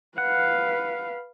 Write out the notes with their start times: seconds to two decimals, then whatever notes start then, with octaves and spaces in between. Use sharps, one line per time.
0.18 B4 F5 F#5